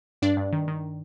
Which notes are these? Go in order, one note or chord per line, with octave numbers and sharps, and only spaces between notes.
G2 D4 D5
G2
D#3
D#3